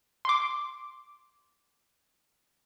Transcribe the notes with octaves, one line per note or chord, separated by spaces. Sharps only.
C6 D6